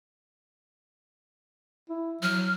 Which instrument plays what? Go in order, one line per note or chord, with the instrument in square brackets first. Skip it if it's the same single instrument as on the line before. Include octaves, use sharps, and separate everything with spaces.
[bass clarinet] E4
[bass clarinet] F#3 [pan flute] F6